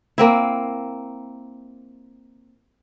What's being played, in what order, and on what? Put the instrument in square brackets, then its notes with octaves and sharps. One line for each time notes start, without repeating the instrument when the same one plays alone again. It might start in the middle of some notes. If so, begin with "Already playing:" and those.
[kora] A#3 C4 E4